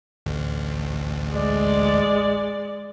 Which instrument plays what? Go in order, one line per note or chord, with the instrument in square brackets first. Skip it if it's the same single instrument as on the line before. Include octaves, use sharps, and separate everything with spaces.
[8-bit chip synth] A1 D2
[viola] G#3 D5